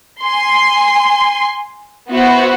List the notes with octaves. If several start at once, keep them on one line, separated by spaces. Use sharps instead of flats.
G#5 C6
B3 E4 F#4 C5 F#5